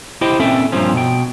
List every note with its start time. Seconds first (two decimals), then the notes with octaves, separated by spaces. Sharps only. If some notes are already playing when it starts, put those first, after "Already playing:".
0.21 E4 G4 C5 D#5 G5
0.40 A#2 C4 C#4 A4 E5 G5
0.72 G2 A#2 F3 C4 C#4
0.93 B2 G5